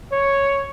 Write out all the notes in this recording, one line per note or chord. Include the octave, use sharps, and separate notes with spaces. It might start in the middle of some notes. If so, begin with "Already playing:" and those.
C#5